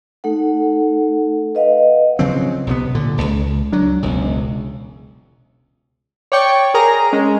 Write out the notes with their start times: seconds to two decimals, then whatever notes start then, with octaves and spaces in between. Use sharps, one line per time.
0.24 A3 D#4 A4 F#5
1.55 B4 D#5 F5 F#5
2.19 C#3 F3 F#3 C4
2.67 B1 C3 F3 B3
2.95 A#2 D3
3.17 D#1 C#2
3.73 F#3 D4
4.02 E1 C#2
6.32 C#5 D5 G5 C#6
6.74 G#4 A#4 A#5
7.13 G#3 C#4